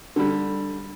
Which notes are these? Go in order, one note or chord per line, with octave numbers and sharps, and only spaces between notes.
D3 G3